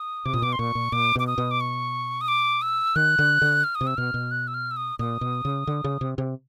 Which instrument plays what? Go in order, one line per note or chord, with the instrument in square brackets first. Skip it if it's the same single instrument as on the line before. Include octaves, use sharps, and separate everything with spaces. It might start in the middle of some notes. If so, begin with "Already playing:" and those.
Already playing: [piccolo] D#6
[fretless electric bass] C3 [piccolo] D6
[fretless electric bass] A#2 [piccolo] D#6
[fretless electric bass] B2 [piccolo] D6
[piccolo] C6
[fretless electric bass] A#2 [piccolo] C#6
[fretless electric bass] A#2
[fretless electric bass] A#2 [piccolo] D6
[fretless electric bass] B2 [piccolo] D6
[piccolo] D#6
[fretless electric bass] B2
[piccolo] D6
C#6
D#6
D6
E6
[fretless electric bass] D#3 [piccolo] F#6
[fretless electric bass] D3
D3
[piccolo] F6
D#6
[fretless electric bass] C3
[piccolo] E6
[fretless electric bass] B2 [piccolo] F6
[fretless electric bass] B2
[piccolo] F#6
E6
F6
E6
D#6
[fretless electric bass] A#2 [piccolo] D#6
[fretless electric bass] B2
C#3
D3
C#3
C3
C3